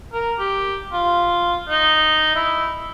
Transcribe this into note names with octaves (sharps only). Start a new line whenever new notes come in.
A#4
G4
F4
D#4
E4